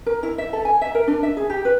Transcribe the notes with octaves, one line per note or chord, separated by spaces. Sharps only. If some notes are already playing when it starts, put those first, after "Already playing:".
A#4
E4
E5
A4
G#5
E5
A#4
D4
E5
G#4
G4
B4